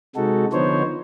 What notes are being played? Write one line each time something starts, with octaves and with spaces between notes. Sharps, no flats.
C3 G#3 D#4 F#4 A4
D3 F3 B3 D#4 C5 C#5